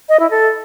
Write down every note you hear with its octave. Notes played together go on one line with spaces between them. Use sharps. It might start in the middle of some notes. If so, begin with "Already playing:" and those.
D#5
E4
A4